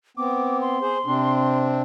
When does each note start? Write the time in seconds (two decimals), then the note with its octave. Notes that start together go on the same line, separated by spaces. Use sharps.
0.17 B3 C4 D6
0.61 C6
0.82 G#4 C5
1.06 C3 C4 D4